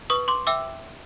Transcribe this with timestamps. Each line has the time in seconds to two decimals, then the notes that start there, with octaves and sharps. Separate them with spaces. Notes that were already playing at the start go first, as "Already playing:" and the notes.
0.10 B4 C#6 D#6
0.28 C6 D6
0.47 E5 G5 D6 E6